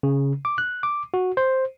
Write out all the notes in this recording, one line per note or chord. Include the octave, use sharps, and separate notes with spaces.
C#3
D6
F#6
D6
F#4
C5